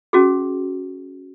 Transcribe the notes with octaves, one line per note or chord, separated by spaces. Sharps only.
C#4 F#4 G#4